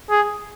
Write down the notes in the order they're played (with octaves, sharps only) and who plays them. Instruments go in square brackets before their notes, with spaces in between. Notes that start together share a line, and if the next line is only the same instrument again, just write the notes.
[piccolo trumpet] G#4